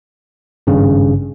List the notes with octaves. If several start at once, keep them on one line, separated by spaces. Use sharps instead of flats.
G#1 G2 C#3